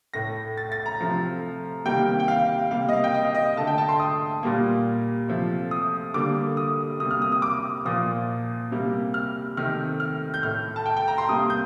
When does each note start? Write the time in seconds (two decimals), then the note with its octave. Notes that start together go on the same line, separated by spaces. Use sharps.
0.14 A2 A3 A#6
0.58 A6
0.72 A6
0.86 A#5
1.00 C3 F3 A3
1.85 C3 D#3 G3 A#3 G5
2.20 G5
2.28 F5
2.71 C3 G3 A#3 F5
2.89 D#5
2.93 F5
3.04 G5
3.14 D#5
3.25 F5
3.35 D#5
3.57 D3 A3 A5
3.67 G5
3.78 A5
3.89 C6
4.00 D#6
4.43 A#2 G3 A#3
5.28 C3 F3 A3
5.71 D#6
6.14 D3 G3 A#3 D6
6.57 D#6
6.99 C3 G3 A#3 D#6
7.11 F6
7.22 D#6
7.32 D#6
7.42 D6
7.85 A#2 F3 A#3 D#6
8.71 C3 G3 A#3
9.14 F6
9.57 C3 D#3 A3 F6
10.00 F6
10.34 G6
10.43 A2 A3 F6
10.76 A5
10.86 G5
10.97 G5
11.08 A#5
11.18 C6
11.29 C3 G3 A#3 D#6
11.50 G6